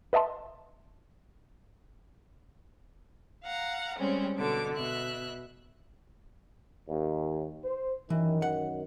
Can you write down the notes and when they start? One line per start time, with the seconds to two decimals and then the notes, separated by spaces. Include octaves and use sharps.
0.13 B4 D#5 E5 A5 C6
3.44 F5 F#5 A#5
3.97 G3 G#3 C4 C#4
4.36 B2 D3 D6
4.75 B2 E5 F#6
6.89 D#2
7.64 C5
8.10 F#2 D#3 E3
8.42 F#5